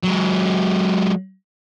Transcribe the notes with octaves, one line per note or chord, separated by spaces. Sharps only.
F#3 G#3